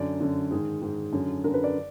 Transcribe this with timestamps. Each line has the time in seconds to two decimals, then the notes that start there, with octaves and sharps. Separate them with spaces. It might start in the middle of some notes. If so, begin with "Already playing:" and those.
Already playing: F#2 D3 D5
0.20 F#2 D3
0.51 G#2 D#3 G#4
0.82 G#2 D#3
1.13 F#2 D3
1.44 F#2 D3 A#4
1.54 B4
1.64 D5